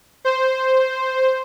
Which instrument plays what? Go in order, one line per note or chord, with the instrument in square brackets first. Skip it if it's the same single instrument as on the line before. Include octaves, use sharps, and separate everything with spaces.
[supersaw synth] C5